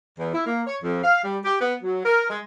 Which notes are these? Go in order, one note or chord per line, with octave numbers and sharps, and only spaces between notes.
E2
E4
A#3
C#5
F2
F5
G3
G4
B3
F#3
A#4
G#3